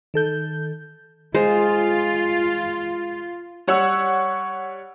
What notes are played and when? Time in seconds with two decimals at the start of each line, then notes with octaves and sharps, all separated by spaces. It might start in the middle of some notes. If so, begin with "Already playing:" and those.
0.14 D#3 A4 G6
1.34 G#3 F4 C5
3.67 G3 C#5 F#5 C#6 E6